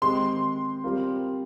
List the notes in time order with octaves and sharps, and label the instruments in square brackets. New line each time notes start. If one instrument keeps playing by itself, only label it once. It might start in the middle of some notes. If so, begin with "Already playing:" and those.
[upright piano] D#3 G#3 C4 G4 [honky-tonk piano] C6
[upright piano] G3 C4 F4 A#4